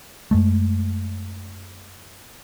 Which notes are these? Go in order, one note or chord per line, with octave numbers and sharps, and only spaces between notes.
F#2 G#3 A3